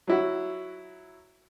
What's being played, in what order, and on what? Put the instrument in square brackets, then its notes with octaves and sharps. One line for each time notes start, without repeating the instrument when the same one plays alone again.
[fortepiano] F#3 E4 F#4